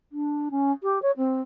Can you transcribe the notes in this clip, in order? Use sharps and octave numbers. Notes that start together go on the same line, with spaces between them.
D4
C#4
G4
C#5
C4